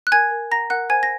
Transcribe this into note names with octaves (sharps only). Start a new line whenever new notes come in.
F#6
A#4 G#5 G#6
A#4
F#5 A#5 A#6
A#4 F#5 F#6
C5 G#5 G#6
A#6